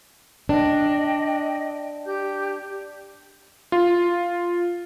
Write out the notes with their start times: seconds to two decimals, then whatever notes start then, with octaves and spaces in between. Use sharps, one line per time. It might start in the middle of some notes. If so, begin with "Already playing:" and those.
0.49 D4 D#5 G5
2.05 G4 G6
3.72 F4